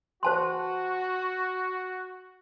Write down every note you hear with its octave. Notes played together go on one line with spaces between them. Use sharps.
F#4 C5 A5 C6